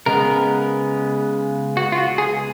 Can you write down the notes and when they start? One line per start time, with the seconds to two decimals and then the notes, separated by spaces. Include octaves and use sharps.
0.06 C#3 G#3 B3 A#4
1.77 F#4
1.92 F4
1.98 F#4
2.18 G#4